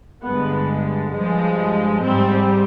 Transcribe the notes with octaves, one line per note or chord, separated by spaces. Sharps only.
G2 D3 G#3 B3
G2 F3 G#3
G#2 G3 C4